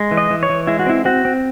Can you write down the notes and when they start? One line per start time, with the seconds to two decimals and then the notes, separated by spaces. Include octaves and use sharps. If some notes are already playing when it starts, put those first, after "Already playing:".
Already playing: G#3
0.11 E3
0.17 D#5
0.30 E3
0.43 C#5
0.49 E3
0.67 G#3 E4
0.79 F#4
0.86 C4 E4
1.05 C4 F#4
1.25 C4